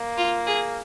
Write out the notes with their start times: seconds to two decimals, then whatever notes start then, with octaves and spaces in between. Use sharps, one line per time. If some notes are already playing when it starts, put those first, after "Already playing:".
Already playing: A#3
0.17 F4
0.47 G#4